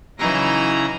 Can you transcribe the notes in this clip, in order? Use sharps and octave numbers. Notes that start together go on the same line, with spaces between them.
C#3 E3 F#3 D#4 E4 A#5